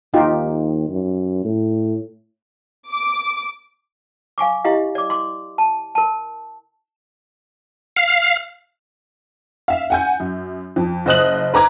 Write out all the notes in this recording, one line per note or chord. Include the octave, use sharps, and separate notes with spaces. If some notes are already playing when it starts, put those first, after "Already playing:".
D#2 D#4 F4 G4
F#2
A2
D6
F5 G#5 C#6 D6
E4 G4 D#5 F5
D5 D6
C6 D6
A5
A#4 A5
F5
E5 F5
F#5 G#5 G6
F#2
F2
F#1 C5 D#5 D#6 F#6 F#7
B4 A#5 D6 G#6